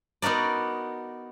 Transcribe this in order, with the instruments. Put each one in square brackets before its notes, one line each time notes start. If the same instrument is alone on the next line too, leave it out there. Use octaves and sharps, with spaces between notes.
[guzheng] B3 D#4 F#4 A#4 D5